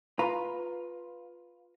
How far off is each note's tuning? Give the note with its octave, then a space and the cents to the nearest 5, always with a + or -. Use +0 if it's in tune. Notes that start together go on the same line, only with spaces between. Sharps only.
F4 +10 B4 +0 A#5 +0